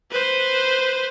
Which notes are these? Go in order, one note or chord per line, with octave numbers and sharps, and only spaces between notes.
B4 C5